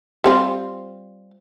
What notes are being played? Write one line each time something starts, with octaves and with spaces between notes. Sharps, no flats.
G3 C4 F4